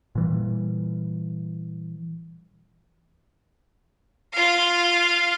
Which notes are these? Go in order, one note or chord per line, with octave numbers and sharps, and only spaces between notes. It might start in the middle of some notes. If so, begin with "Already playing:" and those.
A#2 E3 G3
F4 F5